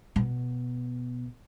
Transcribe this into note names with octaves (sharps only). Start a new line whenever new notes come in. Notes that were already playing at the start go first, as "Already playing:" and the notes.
B2